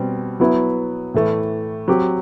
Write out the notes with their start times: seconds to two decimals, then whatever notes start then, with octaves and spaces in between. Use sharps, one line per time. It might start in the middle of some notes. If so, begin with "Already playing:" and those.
Already playing: B2 G3 C4
0.40 F#3 B3 E4
1.14 A2 E3 A3
1.88 F#3 C4 G4